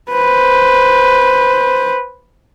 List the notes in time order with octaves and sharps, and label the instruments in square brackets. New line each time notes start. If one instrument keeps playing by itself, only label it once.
[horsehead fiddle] B4 C5